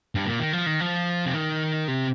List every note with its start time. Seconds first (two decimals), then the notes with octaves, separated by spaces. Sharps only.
0.15 G2
0.26 A#2
0.40 D#3
0.53 F3
0.66 D#3
0.80 F3
1.26 C3
1.34 D#3
1.88 C3